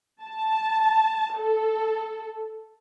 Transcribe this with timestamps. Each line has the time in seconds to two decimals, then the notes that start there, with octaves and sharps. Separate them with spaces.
0.23 A5
1.37 A4